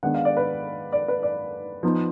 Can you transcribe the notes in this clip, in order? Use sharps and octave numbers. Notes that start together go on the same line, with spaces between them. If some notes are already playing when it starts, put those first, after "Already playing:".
D#3 G#3 B3 D4 F#5
F5
D5
B4
D5
B4
D5
F3 B3 D#4